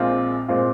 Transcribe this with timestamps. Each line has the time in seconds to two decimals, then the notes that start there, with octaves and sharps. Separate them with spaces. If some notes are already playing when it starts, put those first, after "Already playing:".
Already playing: A#1 A#2 G#3 C4 F4
0.48 A#2 G#3 C4 F4